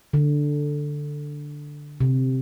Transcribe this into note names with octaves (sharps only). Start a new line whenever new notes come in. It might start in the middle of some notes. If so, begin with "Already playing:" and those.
D3
C3